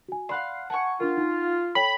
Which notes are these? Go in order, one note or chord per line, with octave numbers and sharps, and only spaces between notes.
F#4 G#5
D5 F5 F#5 B5 C6
F#5 G#5 A5 C#6
D4 F4 A#4
D#4
A4 C#5 G5 B5